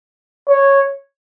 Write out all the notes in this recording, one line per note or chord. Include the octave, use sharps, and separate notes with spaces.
C#5